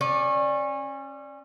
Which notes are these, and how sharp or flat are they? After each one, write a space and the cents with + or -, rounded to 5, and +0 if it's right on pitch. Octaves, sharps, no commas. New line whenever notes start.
C#4 -30 D5 +0